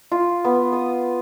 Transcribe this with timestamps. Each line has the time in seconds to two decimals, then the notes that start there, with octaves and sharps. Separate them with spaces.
0.11 F4
0.44 B3
0.73 D#6